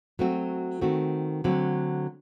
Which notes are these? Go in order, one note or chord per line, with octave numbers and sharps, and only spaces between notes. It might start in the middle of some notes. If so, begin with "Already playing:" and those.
F#3 A3 C4 F#4
D#3 A3 C4 F#4
D3 F#3 A3 C4